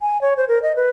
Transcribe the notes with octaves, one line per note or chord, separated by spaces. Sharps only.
G#5
C#5
C5
A#4
D#5
B4